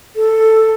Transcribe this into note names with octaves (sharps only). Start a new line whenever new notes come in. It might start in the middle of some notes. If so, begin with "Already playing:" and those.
A4